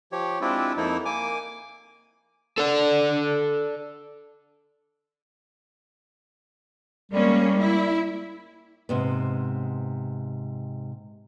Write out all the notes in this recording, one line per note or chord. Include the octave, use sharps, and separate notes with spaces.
F3 G4 C#5
G#3 C4 D4 E4 F4 G4
F2 F3 A#3 D#4 E4
A#3 G#5 D6
A4 D5
G3 G#3 A#3 C#4
E4
G#2 C3 B3